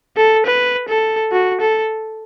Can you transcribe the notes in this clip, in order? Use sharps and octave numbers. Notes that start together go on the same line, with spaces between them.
A4
B4
A4
F#4
A4